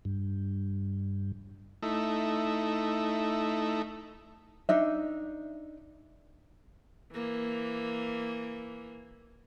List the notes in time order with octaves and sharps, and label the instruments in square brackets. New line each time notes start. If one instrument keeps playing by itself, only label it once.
[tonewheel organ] G2
[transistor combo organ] A3 D#4 E4
[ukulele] D4 D#4 E5
[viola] E3 A#3